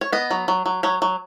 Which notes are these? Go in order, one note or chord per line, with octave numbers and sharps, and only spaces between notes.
C#5
B3 D#5
F#3
F#3
F#3
F#3 C#5
F#3